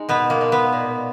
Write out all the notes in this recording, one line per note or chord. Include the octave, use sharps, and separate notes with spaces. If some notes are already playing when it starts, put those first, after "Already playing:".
Already playing: G#3 D#4
B2 B3
A#3
G#3
B3
A#2